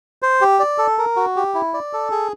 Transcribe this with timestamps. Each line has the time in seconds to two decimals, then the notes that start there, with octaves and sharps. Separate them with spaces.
0.22 C5
0.41 G4
0.60 D5
0.78 A4
0.98 A#4
1.16 F#4
1.36 G4
1.54 E4
1.74 D5
1.93 A4
2.11 G#4